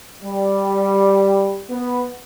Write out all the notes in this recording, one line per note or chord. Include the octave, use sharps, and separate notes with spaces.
G3
B3